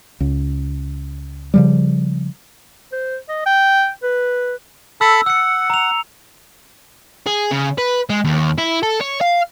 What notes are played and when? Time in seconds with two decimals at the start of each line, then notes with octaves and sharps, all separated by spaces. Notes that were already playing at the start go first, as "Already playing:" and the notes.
0.20 C#2
1.54 C#3 F3 G3
2.92 C5
3.29 D#5
3.46 G5
4.03 B4
5.01 A4 A5 B5 E6
5.26 F#5 E6 C#7
5.70 A#5 F7
7.27 G#4
7.52 C#3
7.78 B4
8.10 G#3
8.25 D#2
8.58 E4
8.83 A4
9.01 C#5
9.21 F5